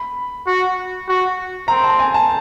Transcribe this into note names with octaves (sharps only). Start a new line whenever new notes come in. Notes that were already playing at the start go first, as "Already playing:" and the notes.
Already playing: B5
F#4
F#4
C4 A#5
A5
G#5
A5